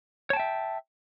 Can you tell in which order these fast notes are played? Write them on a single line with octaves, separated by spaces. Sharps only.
C#5 A5 G5 E5